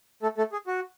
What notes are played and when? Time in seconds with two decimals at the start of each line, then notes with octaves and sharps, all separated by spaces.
0.22 A3 A4
0.37 A3 A4
0.52 G#4
0.67 F#4